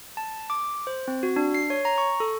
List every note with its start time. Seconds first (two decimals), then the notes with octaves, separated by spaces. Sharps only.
0.17 A5
0.50 D6
0.87 C5
1.08 C4
1.23 F#4
1.36 D4
1.55 C7
1.70 C#5
1.85 A#5
1.98 C#6
2.20 A4